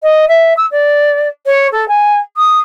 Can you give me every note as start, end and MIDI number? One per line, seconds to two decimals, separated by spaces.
0.03 0.26 75
0.28 0.54 76
0.57 0.66 88
0.71 1.28 74
1.46 1.68 73
1.72 1.87 69
1.88 2.18 80
2.37 2.60 87